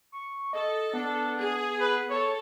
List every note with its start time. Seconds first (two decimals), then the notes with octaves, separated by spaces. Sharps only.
0.12 C#6
0.53 A4 D#5
0.94 B3 D4
1.37 G#4
1.80 B4
2.10 A4 C#5